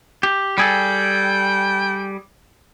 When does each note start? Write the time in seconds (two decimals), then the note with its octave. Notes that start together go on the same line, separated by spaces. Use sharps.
0.23 G4
0.58 G3 G#4 A4 G5